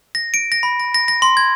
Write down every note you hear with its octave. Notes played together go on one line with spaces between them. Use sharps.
A#6
D7
A#6
B5
A#6
A#6
A#6
C6
G#6